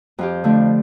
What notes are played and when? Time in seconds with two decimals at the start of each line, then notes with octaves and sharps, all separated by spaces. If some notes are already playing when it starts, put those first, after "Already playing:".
0.18 F2 F4 G4
0.44 D3 F3 A3